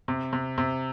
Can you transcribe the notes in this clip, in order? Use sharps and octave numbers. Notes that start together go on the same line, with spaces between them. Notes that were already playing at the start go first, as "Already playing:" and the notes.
C3
C3
C3